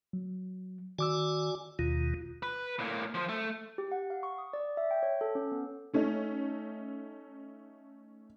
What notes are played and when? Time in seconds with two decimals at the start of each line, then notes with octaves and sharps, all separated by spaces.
0.13 F#3
0.99 D#3 F#4 D5 G#5 D6 E6
1.79 D#2 B2 D#3 F4
2.43 B4
2.79 A2 A#3
3.15 F3 C5
3.29 A3
3.78 G4
3.92 F#5
4.10 F5
4.23 C#6
4.38 D#6
4.53 D5
4.77 E5
4.91 G5
5.03 C#5
5.21 A4
5.35 C#4
5.52 B3
5.94 A3 C#4 D#4